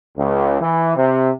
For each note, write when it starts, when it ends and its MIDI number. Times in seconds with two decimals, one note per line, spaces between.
0.17 0.59 37
0.61 0.92 52
0.97 1.30 48